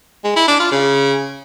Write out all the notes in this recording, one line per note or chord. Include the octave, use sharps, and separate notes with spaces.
G#3
E4
D4
F4
C#3